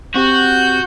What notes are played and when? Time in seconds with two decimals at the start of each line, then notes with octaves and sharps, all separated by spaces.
0.16 C4 F#4 G4 G6